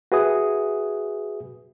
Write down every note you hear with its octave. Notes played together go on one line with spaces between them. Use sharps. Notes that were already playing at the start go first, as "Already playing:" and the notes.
F#4 G#4 B4 E5 G#5 D#6